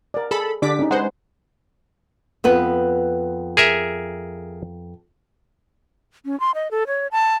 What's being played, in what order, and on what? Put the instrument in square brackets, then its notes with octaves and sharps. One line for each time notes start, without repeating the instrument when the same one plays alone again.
[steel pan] A#4 D5
[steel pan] G#4 [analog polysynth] A4 B5
[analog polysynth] D3 D6 B6 [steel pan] D4 G4 D5
[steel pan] C#4 D#4
[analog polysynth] G#3 C5 [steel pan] B4 F#5
[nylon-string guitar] F2 B3 B4
[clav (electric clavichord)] G#4 A#4 E5
[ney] C#4
C6
D#5
A4
C#5
A5